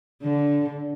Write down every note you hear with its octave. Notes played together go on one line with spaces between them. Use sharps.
D3